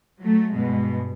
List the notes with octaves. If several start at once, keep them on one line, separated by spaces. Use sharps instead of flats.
F#3 A3
G2 B2 G#3